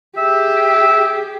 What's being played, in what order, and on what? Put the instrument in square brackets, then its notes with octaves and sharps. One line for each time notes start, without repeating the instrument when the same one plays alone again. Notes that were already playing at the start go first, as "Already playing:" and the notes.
[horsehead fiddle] G4 G#4 [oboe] E5